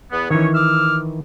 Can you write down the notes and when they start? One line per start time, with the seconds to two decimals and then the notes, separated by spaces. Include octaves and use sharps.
0.11 E2 B3
0.30 D#3 E3 C#4 C#5
0.54 D6 E6 F6